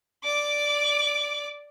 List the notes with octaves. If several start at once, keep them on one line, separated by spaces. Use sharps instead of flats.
D5 D6